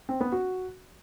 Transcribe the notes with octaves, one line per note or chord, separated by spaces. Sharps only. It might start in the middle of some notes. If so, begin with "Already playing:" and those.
C4
B3
F#4